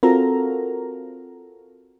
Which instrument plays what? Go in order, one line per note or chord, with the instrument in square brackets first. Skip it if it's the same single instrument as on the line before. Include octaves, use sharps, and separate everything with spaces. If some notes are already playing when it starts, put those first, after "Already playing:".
[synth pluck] C4 F4 F#4 A4 A#4 A#5